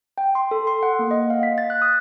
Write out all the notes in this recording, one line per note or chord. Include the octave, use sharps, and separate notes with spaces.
G5
C6
A4
C6
F#5
A#3
D#5
F5
B6
A6
F#6
D#6